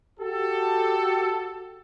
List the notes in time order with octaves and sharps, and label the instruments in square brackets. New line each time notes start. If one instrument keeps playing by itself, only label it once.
[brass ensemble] F#4 G4 A4